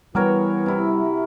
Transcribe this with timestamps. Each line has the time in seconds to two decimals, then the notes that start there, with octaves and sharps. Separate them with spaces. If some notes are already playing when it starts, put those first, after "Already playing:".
0.15 E3 G3 B3 F#4 A#4 C#5
0.66 C3 E4